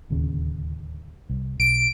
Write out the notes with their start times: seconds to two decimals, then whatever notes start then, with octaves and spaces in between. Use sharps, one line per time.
0.10 D1 D#2 C#3
1.30 C2
1.60 B1 D7